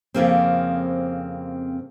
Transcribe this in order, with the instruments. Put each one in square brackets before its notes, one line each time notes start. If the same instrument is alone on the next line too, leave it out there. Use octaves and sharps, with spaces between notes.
[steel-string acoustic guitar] F2 C#3 A#3 C4